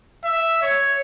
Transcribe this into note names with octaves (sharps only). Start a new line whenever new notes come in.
E5
C#5